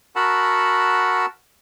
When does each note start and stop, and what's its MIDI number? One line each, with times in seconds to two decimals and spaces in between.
0.16 1.26 66
0.16 1.26 70
0.16 1.26 78
0.16 1.26 81
0.16 1.26 83
0.16 1.26 88